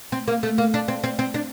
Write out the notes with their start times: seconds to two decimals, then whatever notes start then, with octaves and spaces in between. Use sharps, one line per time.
0.12 C4
0.28 A#3
0.43 A3
0.58 A#3
0.74 D4
0.88 C4
1.04 C4
1.19 C4
1.34 D4